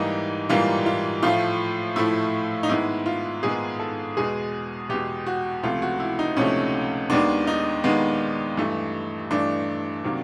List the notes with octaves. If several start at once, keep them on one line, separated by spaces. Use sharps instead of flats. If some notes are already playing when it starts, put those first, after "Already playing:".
Already playing: G#2 E3 G3 A#3 D#4
G#2 E3 G3 A#3 F4
F4
A2 F3 A3 F4
A2 F3 A3 E4
D#4
G#2 D#3 G#3 B3 E4
F4
G#2 D#3 G#3 B3 G#4
A4
E2 B2 G#3 G#4
E2 B2 G#3 G4
F#4
C#2 C3 F3 A3 F4
F#4
E4
D#4
C#2 C3 F3 A3 C#4
D#2 D#3 G#3 B3 D4
D#4
D#2 D#3 G#3 B3
G2 E3 A3
G2 E3 A3 D4
C3 D#3 F#3 A#3